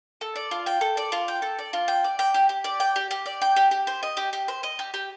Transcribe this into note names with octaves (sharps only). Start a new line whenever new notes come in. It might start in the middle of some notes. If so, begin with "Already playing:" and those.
A4
D5
F4
G5
A4
D5
F4
G5
A4
D5
F4
G5
D5
G5
G4
G4
D5
G5
G4
G4
D5
G5
G4
G4
C5
D#5
G4
G4
C5
D#5
G4
G4